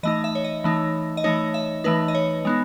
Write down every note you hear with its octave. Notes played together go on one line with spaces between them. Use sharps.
E3 A3 D#4 D#5
E5
C#5
D#5
E3 A3 D#4
D#5
E3 A3 D#4 C#5
E5
E3 A3 D#4 B4
D#5
C#5
G#3 B3 D#4